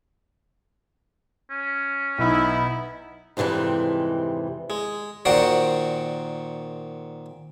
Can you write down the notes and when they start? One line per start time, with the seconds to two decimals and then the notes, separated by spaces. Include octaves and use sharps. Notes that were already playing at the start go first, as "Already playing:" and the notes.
1.50 C#4
2.18 B1 B3 D#4 E4
3.37 F2 G#2 C3 E3 G3
4.70 G#3
5.25 A#2 D#3 F#4 C5 D5 A#5